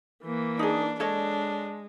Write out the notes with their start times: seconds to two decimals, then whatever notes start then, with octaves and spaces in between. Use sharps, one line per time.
0.23 E3 A#3
0.59 D4 D#4 G#4
1.00 G#3 D4 A4 C#5 D#5